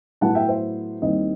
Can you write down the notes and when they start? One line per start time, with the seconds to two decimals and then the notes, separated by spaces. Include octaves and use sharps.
0.21 A2 F#3 B3 E4 F#5 A5
0.35 E5 G5
0.48 C5 E5
1.02 D#2 D#3 G3 C4 E4 D#5